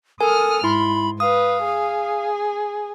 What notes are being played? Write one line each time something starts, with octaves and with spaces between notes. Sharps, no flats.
A4 A#4 G#5 D#6 F6
G#2 E4 B5 C6
B4 F5 D#6
G#4